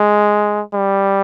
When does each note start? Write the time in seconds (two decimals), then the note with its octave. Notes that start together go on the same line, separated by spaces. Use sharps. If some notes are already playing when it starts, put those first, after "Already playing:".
Already playing: G#3
0.75 G3